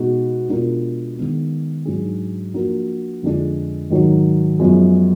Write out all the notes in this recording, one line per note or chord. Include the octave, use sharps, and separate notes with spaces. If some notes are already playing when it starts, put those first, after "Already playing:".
Already playing: B2 G#3 D#4 F#4
B2 G#3 D4 F4 A#4
D#3 G#3 B3
G#2 F#3 D4 G#4
F3 A#3 D4 F#4 A#4
F2 D3 F3 G#3 D4
G#2 D#3 F#3
F#2 F3 G#3 B3